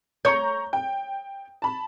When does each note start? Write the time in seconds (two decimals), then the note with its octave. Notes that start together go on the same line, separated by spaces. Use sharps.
0.25 C#5 A#5 C#6 G6
0.73 G5
1.62 A5 B5